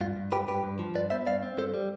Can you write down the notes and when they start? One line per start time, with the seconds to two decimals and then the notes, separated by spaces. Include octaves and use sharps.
0.01 G2 F4
0.16 G2
0.32 G2 G4 B4
0.48 G2 G4 B4
0.64 G2
0.79 F3
0.95 G2 B4 D5
1.10 B3 C5 E5
1.27 G2 D5 F5
1.43 C4
1.58 G2 A4 C5
1.74 G3